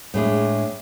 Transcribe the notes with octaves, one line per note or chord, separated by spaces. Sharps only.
A2 G#3 D4